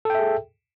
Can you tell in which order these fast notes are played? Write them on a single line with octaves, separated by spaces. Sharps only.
A4 G5 E5 G#4